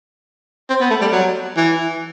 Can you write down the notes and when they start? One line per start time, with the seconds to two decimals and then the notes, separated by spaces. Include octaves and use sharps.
0.70 C4
0.81 B3
0.91 A3
1.01 G3
1.12 F#3
1.57 E3